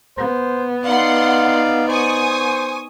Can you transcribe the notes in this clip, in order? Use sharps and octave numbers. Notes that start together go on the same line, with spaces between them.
B3 C5
D#4 D5 F5 F#5 C6
C5 G#5 C#6 D#6